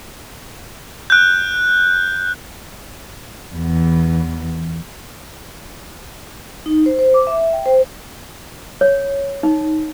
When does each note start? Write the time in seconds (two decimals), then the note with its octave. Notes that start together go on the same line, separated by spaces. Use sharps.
1.10 F#6 G6
3.55 E2 E3
6.66 D#4
6.86 C5
6.99 C5
7.14 D6
7.27 E5
7.53 G5
7.66 C5
8.81 C#5
9.43 D#4